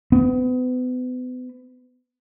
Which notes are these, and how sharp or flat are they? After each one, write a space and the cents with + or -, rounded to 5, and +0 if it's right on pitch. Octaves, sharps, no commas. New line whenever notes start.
B3 +35